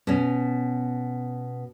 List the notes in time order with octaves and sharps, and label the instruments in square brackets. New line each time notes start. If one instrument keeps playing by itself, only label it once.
[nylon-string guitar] B2 C#4